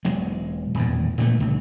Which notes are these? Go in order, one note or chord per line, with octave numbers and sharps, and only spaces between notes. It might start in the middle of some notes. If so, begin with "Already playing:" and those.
E1 F#3 G#3
D#1 E2 A2
A#2 D3 A3
C#2 G2